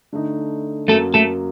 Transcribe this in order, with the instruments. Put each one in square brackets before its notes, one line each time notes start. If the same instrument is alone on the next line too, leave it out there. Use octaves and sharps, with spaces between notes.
[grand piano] D3 A3 D#4
[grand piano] F#2 F#3 A#3 [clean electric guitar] A3 A4
[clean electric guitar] A3 A4